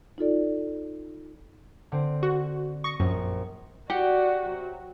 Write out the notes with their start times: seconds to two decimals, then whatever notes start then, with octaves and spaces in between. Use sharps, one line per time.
0.18 D#4 F4 A4 D5
1.92 D3 C4
2.23 F#4
2.84 C#6 D#6 A#6
3.00 A#1 F#2
3.90 F#4 G4 D5 F#5
4.44 C3 F#3